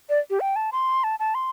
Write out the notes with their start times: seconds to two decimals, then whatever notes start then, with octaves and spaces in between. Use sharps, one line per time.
0.09 D5
0.30 G4
0.40 G5
0.56 A5
0.72 C6
1.04 A5
1.19 A5
1.35 C6